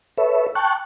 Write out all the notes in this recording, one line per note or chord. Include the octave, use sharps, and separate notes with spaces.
A4 B4 C#5 E5
G5 A5 C#6 F#6